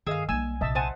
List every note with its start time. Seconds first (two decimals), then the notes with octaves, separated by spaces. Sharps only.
0.07 G2 D#3 G#4 D#5 F5 E6
0.29 B1 G3 A#3 G#5 E6
0.61 A#1 C3 D#5 E5 A5
0.75 C5 F#5 G#5 A5 D#6